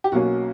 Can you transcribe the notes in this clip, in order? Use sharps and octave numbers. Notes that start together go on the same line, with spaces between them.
G4
B1 B2 A#3 C#4 F#4